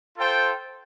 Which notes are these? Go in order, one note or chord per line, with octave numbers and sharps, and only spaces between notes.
F4 A4 C5 G5